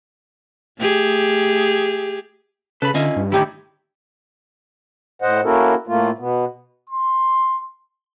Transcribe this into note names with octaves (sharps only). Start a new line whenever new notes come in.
A3 G4 G#4
C#3 A4 B4 B5
D3 C#4 F4 D#5 E5
G2
A2 D3 D#3 D#4 E4 G4 C#5
A2 C5 D#5 F#5
A#3 C#4 E4 F#4 A4 A#4
A2 A3 A#3 F4
B2 B3
C6